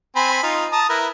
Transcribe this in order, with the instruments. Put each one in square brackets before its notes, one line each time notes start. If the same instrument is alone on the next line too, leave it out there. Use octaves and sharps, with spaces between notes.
[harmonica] C4 G#5 B5
D#4 F4
A5 A#5 D#6
E4 A#4 B4